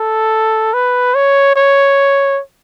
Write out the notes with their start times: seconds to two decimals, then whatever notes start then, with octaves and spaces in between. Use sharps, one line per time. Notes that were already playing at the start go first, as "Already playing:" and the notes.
Already playing: A4
0.73 B4
1.14 C#5
1.56 C#5